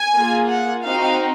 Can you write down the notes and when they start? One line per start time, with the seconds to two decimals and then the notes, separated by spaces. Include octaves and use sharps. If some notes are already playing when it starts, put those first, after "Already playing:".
Already playing: G#5
0.15 A#3 F4 G#4
0.49 F#5
0.84 C4 D#4 F#4 F5